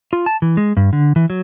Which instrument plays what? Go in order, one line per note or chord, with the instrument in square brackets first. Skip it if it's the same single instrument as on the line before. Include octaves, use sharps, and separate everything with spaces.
[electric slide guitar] F4
A5
E3
G#3
G2
D3
E3
F#3